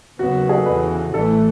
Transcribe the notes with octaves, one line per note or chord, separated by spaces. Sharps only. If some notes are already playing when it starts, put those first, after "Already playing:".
D#2 C#3 F#3 B3 F#4
G#4
A4
E2 C#3 E3 B4
A1 A2 E3 A3 A4